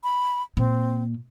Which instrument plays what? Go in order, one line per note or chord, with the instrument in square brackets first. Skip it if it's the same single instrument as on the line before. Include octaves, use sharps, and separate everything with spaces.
[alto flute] B5
[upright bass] A#2 [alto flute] C4